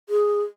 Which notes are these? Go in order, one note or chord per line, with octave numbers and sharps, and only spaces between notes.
G#4